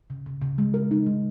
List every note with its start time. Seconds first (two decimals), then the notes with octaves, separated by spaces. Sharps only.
0.10 C#3
0.26 C#3
0.42 C#3
0.58 G#3
0.74 A#4
0.91 D#4
1.06 G#3